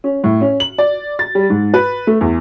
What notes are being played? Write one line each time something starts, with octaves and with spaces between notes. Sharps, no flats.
C#4
A2
C#4
F#7
D5
A6
G3
G#2
B4
A3
E2